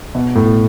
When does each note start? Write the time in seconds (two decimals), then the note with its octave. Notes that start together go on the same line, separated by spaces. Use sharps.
0.15 B2
0.35 A2